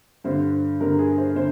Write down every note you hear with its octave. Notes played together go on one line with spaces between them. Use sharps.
G2 D3 C5
G2 D3 A#4
G#4
C5
D3 C5